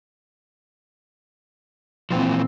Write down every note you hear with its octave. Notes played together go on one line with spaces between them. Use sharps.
A#2 E3 F3 C4